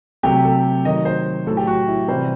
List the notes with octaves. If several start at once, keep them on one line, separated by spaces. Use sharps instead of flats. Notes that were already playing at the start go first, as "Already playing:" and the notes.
C3 F#3 A3 G4
A4
D#3 F#3 A3 D#5
C5
A2 F#3 A3 A4
G4
F#4
E4
C3 E3 G3 C5